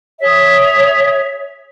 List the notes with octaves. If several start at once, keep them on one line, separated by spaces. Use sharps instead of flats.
G#4 C#5 E5